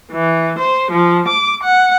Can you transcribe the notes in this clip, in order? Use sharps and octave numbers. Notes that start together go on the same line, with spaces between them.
E3
C5
F3
D6
F#5